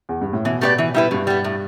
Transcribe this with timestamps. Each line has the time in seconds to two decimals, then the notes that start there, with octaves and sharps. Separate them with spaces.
0.09 E2
0.21 G2
0.33 A2
0.45 B2 E3
0.61 A3 G4 B4 D5
0.78 E3
0.94 G3 E4 B4
1.11 G2 B2
1.27 G3 B3
1.44 A2